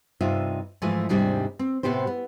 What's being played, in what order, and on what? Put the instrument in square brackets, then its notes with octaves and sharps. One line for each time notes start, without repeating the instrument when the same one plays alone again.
[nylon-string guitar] G2 C3 D#4 F4 E5
G#2 E3 F3 G#3 A3
D#2 G#2 C3 G3 D4 D#4
C4
A2 C3 B3 G4 C5
B3